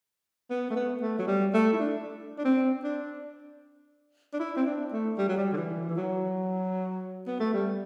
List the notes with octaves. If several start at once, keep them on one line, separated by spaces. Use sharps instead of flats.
B3
A3
B3
A3
F#3
G3
A3
E4
D4
D4
C4
D4
D4
E4
C4
D4
A3
G3
F#3
G3
D3
E3
E3
F#3
B3
A3
G3